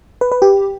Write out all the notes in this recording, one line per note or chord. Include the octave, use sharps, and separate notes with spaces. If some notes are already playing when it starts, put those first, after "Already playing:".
B4
B4
G4